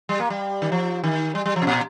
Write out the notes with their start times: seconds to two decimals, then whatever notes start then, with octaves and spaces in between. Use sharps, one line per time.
0.09 G3
0.20 A#3
0.30 G3
0.62 D#3
0.72 F3
1.04 D#3
1.35 G3
1.46 G3
1.56 F3
1.62 C3
1.67 A#2